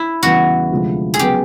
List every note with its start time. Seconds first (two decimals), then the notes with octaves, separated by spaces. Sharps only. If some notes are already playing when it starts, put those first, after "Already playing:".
Already playing: E4
0.23 E2 C#3 E3 G3 B3 F#4
0.71 D2 C3 F3 G#3
1.14 G#4
1.19 C#3 F#3 B3 G4